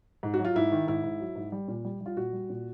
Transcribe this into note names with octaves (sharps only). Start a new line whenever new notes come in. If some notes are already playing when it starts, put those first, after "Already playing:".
G#2
F#4
F#3
F4
G#2 E4
D#3
G#2 E4
G#2
F#3
G#2
G3
A#2
G3
G3
F4
A#2 F#4
G3
A#2